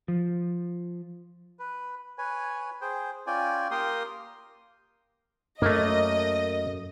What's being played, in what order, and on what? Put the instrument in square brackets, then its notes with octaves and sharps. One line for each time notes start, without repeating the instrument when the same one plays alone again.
[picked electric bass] F3
[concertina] B4
B4 C#5 G#5
G#4 C5 G5
C#4 F4 D5 G5 G#5
A#3 G4 A#4 G5 C6 D#6
[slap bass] F#2 [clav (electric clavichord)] A3 A#3 [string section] D#5